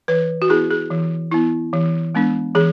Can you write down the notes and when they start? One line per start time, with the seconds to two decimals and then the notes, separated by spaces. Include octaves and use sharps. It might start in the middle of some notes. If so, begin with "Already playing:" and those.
0.08 E3 B4
0.42 F#4
0.49 B3 E4 G#4
0.70 G#4
0.90 E3
1.31 B3 E4
1.73 E3
2.15 G#3 B3 D4
2.55 E3 G#4